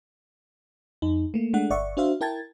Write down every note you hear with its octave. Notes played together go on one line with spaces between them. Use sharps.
F2 D#4
A3 A#3
G#3 A3 D4 F#5
G1 D5 E5 F#5 C#6
D4 F#4 C5 E5 F5
E4 A#4 G5 A5 G#6 A6